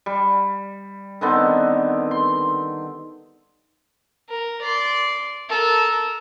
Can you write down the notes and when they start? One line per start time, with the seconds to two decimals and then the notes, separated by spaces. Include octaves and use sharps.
0.06 G3
1.21 D3 D#3 B3 C4
2.11 C6
4.29 A#4
4.62 D5 C6
5.50 A4 A#4